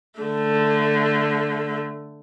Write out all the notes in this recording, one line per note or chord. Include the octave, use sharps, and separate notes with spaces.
D3 A3